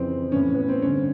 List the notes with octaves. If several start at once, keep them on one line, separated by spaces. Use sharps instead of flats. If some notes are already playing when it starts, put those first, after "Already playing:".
Already playing: F2 C#3 E3 C4
A2 E3 C#4
B3
C4
G2 D3 C#4